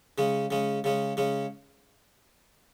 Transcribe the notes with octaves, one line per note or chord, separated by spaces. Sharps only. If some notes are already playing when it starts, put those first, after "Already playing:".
C#3 G#3 C#4
C#3 G#3 C#4
C#3 G#3 C#4
C#3 G#3 C#4